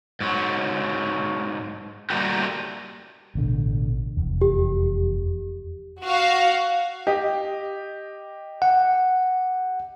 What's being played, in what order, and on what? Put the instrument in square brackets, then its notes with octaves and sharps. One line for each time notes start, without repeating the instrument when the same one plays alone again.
[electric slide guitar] G#2 F#3
G3 A3 A#3 D#4 F#4 G4
[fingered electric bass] A1 B2 D3
F1 E2
[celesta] G4
[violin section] F#4 F5
[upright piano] G4 D#5
[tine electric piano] F#5